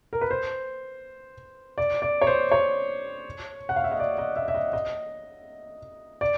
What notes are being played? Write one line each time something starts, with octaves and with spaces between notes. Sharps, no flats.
A#4
B4
C5
D5
D5
C#5
C5
C#5
F#5
F5
E5
D#5
D5
D#5
E5
E5
D#5
D#5
D5